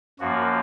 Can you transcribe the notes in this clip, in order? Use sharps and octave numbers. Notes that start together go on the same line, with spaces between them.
F#2 F3 A#3 F#4